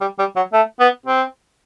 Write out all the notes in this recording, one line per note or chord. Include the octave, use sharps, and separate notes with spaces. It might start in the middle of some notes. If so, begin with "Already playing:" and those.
G3
G3
F#3
A3
B3
C4